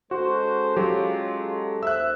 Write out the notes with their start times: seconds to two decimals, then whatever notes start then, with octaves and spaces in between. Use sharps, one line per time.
0.11 G#3 C#4 F#4 A4 C5
0.77 F#3 F4 G4
1.83 D#2 C5 E5 E6 F#6